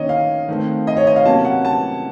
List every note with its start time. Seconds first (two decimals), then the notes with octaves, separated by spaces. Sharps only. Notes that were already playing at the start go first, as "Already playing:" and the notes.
Already playing: D#3 A#3 C#4 C#5 D#5
0.09 F5
0.49 D#3 A3 C4
0.87 D#5
0.97 C#5
1.07 D#5
1.16 F5
1.26 C3 F#3 A#3 C#4 A5
1.45 F#5
1.65 A5